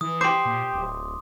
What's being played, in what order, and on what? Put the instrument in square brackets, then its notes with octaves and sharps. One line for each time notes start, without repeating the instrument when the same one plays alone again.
[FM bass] E3 [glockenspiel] D#6
[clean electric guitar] G4 C5 [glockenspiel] C6 D6
[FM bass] A#2
D1